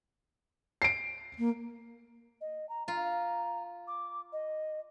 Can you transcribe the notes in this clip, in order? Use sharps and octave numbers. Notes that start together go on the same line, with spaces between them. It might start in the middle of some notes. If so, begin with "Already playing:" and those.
C7 D7
A#3
D#5
A#5
F4 A#5
D6
D#5